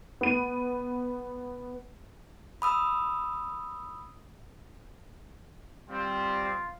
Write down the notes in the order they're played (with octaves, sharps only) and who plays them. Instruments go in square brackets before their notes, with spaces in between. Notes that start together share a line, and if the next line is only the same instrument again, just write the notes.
[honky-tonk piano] B3 D#7
[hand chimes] B5 D#6 E6
[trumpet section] G3 C4 [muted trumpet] F4